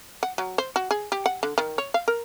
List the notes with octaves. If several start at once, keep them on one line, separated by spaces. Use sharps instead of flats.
F#5
F#3
C5
F#4
G#4
G4
F#5
D3
D#3
C#5
F5
A#4